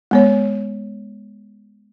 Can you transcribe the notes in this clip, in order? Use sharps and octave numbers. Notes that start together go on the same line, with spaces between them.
G#3 B3 C#5